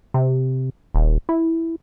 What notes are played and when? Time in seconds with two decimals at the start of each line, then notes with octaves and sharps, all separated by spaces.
0.14 C3
0.95 D#1
1.29 E4